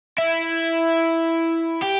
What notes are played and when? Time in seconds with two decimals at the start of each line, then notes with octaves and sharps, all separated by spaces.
0.18 E4
1.82 G4